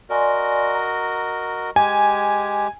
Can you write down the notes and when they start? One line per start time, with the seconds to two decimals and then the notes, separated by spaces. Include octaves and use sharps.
0.10 F#4 A#4 D5 D#5 G#5 C6
0.75 A#5
1.76 G#3 G4 G#5